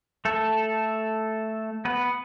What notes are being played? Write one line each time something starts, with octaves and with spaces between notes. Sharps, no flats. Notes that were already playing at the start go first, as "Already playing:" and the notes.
A3 A4
B3 B4